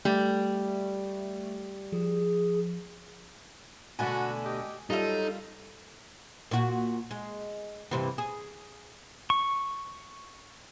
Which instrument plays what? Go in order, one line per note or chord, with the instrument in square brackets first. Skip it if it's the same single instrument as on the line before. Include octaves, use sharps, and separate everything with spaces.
[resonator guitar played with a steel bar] G3 [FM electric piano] A3
[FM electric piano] F3 [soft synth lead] G#4
[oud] B2 D3 A3 [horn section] F#4 [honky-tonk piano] G#5
[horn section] G4 D#5
[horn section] F#3 [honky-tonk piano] G3 F4 [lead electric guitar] D#4 [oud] A4 E5
[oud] A#2 F#4
G#3
G2 C3 E3
G#4
[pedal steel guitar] C#6